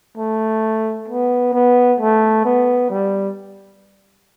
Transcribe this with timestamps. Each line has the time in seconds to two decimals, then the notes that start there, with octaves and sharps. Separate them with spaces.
0.17 A3
1.08 B3
1.53 B3
2.00 A3
2.45 B3
2.90 G3